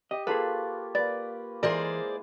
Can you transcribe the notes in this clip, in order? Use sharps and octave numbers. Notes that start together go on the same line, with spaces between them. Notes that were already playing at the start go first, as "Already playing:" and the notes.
G4 D#5
A#3 F4 G#4 A4 B4 C#6
A#3 B4 D5
E3 G#3 E4 G#4 A#4 C5 D5